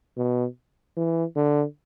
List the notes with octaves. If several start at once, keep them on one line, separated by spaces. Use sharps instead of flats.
B2
E3
D3